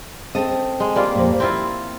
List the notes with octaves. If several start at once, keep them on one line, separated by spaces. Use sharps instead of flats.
C4 A4 D#5
G#3
G3 A#3 F4
F2 A#2
C4 E4 F4 G5